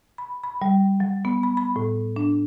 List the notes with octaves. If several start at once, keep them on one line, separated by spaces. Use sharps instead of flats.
B5
B5
G3
F#3
B3
B5
B5
A2
D4